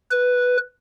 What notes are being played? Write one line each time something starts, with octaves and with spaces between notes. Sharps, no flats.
B4